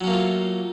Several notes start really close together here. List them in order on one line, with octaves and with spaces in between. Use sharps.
F#3 C#4 A#3 A3 F4